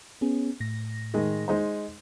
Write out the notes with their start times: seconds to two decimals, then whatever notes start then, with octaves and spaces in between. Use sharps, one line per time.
0.21 B3 C#4 G#4
0.60 A2 A#6
1.14 D#3 G#3
1.48 G#3 D#4 C5